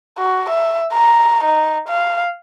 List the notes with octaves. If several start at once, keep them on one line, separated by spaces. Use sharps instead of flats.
F#4
E5
A#5
D#4
F5